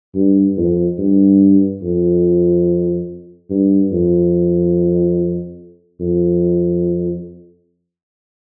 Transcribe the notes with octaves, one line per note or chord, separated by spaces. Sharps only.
G2
F2
G2
F2
G2
F2
F2